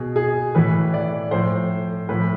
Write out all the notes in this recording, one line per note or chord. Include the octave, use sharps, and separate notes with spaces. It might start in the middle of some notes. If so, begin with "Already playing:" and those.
Already playing: B2 G#4
G#4
A2 E3 B4
D5
A2 F3 C5
A2 F3 B4